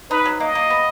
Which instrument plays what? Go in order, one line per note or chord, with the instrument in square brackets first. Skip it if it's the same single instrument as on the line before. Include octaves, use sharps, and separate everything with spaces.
[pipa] D#4 [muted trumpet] B4
[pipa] F#3
[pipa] A#3 [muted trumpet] D#5
[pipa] A#3
B3